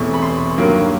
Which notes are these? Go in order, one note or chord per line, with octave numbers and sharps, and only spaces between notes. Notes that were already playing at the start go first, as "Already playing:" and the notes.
Already playing: E1 E2 C3 E3 A3 C#6
B5
C6
G2 D#3 F#3 A#3